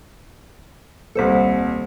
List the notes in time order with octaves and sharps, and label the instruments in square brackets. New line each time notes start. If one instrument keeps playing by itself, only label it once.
[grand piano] D#1 C2 [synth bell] A4 C5 B6